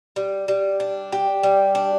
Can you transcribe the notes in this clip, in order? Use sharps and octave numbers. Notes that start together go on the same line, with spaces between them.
G3
G3
D4
G4
G3
D4